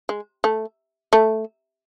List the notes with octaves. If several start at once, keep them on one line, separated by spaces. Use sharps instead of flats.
G#3
A3
A3